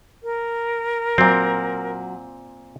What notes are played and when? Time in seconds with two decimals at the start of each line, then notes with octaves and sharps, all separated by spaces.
0.23 A#4
1.18 A#2 F#3 C4